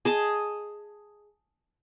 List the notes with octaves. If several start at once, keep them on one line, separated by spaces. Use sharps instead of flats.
G#4 D#5 A5